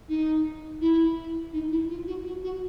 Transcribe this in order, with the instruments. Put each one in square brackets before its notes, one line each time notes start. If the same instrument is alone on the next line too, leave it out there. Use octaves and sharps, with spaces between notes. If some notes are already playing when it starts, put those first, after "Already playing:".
[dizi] D#4
E4
D#4
E4
F4
F#4
F#4
F#4